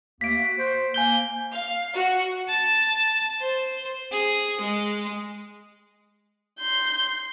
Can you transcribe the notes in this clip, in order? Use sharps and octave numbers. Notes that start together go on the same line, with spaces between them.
D#2 A3 A#3 B6 D7
F#4
C5
A#3 G#5 G6 G7
F5
F#4
A5
C5
G#4
G#3
C6 G6